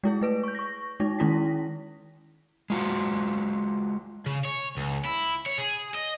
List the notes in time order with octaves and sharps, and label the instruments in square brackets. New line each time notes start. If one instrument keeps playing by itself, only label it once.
[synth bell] G#3 E4 G#4
A3 B4 D7
C#6 G6
C#6 A#6
G#3 D#4 A#6
D#3 G#3 C#4 E4 A#6 B6
[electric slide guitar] G#3 F4 F#4
[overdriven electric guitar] C#3
C#5
C#2
E4
C#5
G#4
D#5